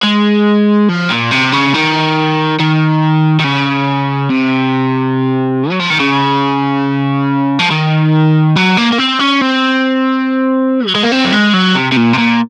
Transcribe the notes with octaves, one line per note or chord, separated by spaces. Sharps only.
G#3
F3
A#2
C3
C#3
D#3
D#3
D#3
C#3
C3
F#3
F3
D#3
C#3
F3
D#3
F#3
A#3
A#3
C4
C#4
C4
F#3
G#3
A#3
C4
F#3
G#3
F#3
C3
C3
A#2
C3
A#2